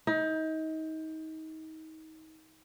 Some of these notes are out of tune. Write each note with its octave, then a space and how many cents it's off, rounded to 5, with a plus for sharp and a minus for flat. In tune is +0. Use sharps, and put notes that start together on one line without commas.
D#4 +30